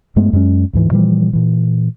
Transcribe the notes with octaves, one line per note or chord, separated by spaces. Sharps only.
G2 G#3 A3 B3
F#2 G#3 A#3 C#4
D2 G#2 E3
A#2 E3 F3 G3
A#2 E3